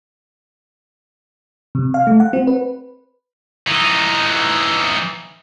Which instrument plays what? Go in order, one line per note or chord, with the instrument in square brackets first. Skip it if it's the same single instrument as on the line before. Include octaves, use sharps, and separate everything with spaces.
[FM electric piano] C3
F5
A3
F#5
C4
B4
[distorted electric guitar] E3 D#4